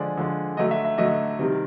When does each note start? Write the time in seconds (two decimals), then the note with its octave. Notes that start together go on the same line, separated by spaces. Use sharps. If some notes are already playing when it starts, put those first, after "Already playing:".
Already playing: D3 F3 G#3 D5
0.17 D3 F3 G#3
0.57 D3 F#3 A3 D#5
0.71 E5
0.85 E5
0.98 D3 F#3 A3 D#5
1.39 C3 D#3 G3